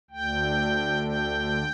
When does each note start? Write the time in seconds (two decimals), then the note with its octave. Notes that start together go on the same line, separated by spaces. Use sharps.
0.10 D2 D3 G5
1.03 G5